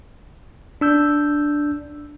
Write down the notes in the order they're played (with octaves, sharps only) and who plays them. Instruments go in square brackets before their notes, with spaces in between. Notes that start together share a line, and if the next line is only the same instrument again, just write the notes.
[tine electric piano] D4 E6 G6